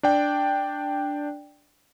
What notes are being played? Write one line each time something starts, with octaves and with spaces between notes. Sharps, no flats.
D4 D5 G5